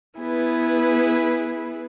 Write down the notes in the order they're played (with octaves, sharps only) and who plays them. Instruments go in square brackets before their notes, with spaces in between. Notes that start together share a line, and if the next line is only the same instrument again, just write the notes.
[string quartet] B3 E4 G#4 B4